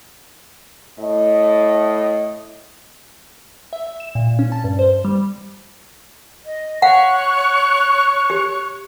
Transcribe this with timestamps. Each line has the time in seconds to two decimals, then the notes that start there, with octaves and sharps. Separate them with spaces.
0.99 A2 D#5
3.73 E5
3.87 E5
4.00 E7
4.15 A#2
4.39 C#4
4.52 A5
4.64 G2
4.79 C5
5.05 G3
6.43 D#5
6.82 C#5 F5 F#5 C#6 F#6
8.30 G4